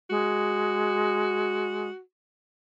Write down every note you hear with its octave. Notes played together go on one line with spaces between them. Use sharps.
G#3 F#4